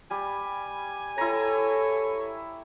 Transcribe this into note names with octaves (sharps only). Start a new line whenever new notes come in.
G3 G#5
E4 A4 C#5 A#5